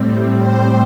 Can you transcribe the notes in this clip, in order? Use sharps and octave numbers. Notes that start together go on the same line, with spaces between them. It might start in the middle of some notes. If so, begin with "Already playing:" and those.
Already playing: A2 G3 C4
C5